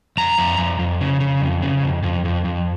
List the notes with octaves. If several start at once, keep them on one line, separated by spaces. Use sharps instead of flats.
F2 A#5
F2
F2
F2
C#3
C#3
F2
C#3
F2
F2
F2
F2